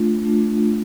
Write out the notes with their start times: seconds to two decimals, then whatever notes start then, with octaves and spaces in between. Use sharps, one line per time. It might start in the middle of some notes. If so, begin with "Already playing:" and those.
Already playing: A3 D4 F4
0.25 A3 D4 F4